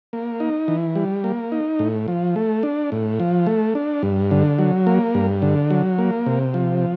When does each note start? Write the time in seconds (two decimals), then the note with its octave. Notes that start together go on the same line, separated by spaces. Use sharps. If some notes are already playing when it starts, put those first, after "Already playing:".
0.13 A#3
0.40 D#4
0.68 E3
0.95 G3
1.24 A#3
1.52 D#4
1.79 A2
2.08 F3
2.36 A3
2.63 D4
2.92 A2
3.20 F3
3.47 A3
3.75 D4
4.03 G2
4.31 D3
4.59 F#3
4.87 A#3
5.15 G2
5.42 D3
5.71 F#3
5.98 A#3
6.26 C3
6.54 F3